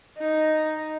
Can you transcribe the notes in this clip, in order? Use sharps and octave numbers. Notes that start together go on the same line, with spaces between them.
D#4